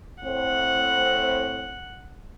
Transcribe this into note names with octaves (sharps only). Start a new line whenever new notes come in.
A2 C4 F#5